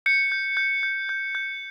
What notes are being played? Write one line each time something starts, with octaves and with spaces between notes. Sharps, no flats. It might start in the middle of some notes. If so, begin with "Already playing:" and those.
G6 C#7
G6
G6
G6
G6
G6